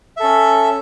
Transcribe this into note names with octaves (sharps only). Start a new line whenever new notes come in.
C#4 A4 E5